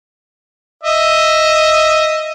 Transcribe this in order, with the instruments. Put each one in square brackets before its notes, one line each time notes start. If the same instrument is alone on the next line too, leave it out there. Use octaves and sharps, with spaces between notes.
[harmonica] D#5 E5